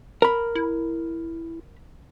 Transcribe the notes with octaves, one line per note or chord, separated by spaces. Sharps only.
A#4 B5
E4